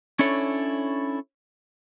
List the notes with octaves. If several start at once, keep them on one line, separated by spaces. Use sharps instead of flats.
C#4 D4 E4 A4 C#5